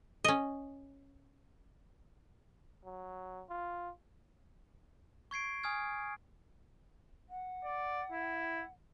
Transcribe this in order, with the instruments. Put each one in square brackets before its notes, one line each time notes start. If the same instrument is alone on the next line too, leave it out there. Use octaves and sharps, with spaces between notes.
[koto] C#4 D#5
[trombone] F#3
F4
[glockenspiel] C#6 G#6 C7 D7
G#5 D#6 F6 G#6
[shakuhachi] F#5
[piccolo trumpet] D5
E4